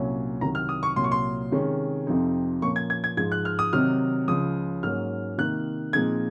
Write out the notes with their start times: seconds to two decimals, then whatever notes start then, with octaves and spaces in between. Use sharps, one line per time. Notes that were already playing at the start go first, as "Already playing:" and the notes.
Already playing: C2 A#2 F#3 C#4
0.41 C2 C3 D#3 F#3 A#5
0.55 F6
0.69 D#6
0.83 C#6
0.96 C2 A#2 F#3 C6
1.04 C#6
1.12 C6
1.52 C3 D#3 G#3 C#4
2.07 F2 C3 F3 C4 D#4
2.62 A#2 F3 A#3 C#4 C#6
2.76 G#6
2.90 G#6
3.04 G#6
3.17 G#2 F3 G#3 G#6
3.32 F#6
3.45 F6
3.59 D#6
3.73 C3 D#3 F#3 C4 D#4 F6
4.28 C#2 C#3 F3 D#6
4.83 G#2 F#3 A#3 C#4 F6
5.38 C3 D#3 A#3 D#4 F#6
5.93 A#2 F3 G#3 C4 D#4 G#6